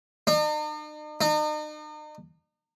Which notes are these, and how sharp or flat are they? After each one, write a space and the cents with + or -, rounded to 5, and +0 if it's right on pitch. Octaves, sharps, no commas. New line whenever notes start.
D#4 -45
D#4 -40